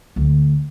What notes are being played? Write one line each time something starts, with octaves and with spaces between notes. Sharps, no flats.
D2